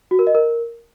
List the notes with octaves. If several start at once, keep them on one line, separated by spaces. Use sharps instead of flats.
F#4
A#4
D#5
A#4